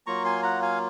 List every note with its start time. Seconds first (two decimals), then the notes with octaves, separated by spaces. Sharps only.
0.06 F#3 A#3 F4 A#5 C#6
0.25 G#5 C6
0.43 F#5 A#5
0.62 F5 G#5